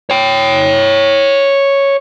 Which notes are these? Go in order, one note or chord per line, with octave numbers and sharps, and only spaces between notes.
C#5 G5